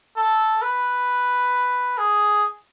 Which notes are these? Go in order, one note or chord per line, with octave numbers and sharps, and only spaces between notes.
A4
B4
G#4